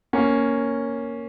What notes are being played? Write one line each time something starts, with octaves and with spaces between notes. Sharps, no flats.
A#3 C#4